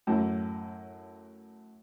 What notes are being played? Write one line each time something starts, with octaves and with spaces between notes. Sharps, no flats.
F#2 A2